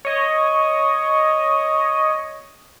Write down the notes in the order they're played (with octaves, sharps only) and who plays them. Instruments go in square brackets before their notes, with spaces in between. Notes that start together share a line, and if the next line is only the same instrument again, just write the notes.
[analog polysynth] C#5 D#5